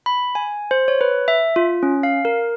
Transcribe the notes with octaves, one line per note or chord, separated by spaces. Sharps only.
B5
G#5
C5
C#5
B4
E5
F4
C#4
F5
A#4